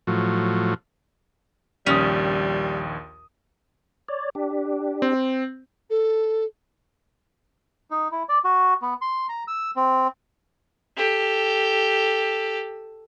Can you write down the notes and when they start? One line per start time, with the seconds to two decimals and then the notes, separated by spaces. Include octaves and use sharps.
0.07 A2 F3 F#3
1.87 A#1 D#2 G3 C#4 D#6
4.08 C#5 D5
4.35 D4 G4
5.02 C4
5.90 A4
7.91 D#4
8.12 E4
8.29 D5
8.44 F#4
8.82 B3
9.02 C6
9.29 A#5
9.48 E6
9.76 C4
10.97 G4 A4